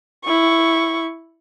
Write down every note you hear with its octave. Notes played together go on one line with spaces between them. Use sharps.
E4 C#6